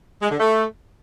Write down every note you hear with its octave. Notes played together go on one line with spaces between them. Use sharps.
G#3
D3
A3